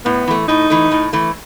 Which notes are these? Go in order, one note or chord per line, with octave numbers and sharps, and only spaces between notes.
A2 B3
E3 A3
A2 D#4
E3 A3
A2
E3 A3